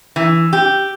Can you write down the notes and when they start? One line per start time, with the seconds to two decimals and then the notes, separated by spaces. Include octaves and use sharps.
0.16 E3
0.53 G4